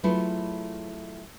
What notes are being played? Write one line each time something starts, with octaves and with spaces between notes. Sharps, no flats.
F#3 A3 E4 F4 G#4 B4